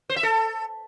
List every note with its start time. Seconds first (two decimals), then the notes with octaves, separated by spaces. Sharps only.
0.09 C5
0.16 E5
0.23 A4